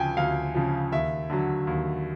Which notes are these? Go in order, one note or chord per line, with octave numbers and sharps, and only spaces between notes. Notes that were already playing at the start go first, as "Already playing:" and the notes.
Already playing: D2 C#3 F3 G5 G#5
D2 F5
C#3 F3
D#2 E5
D3 F#3
D#2